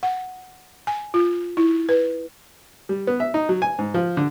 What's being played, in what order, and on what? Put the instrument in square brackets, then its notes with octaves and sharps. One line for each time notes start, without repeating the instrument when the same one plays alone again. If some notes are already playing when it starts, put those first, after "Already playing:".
[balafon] F#5
G#5
F4
E4
B4
[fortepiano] G3
B3
E5
D#4
F#3
G#5
G#2
F3
D3